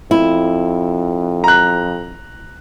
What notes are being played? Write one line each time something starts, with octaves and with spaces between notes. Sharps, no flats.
F2 E4
A#5 F#6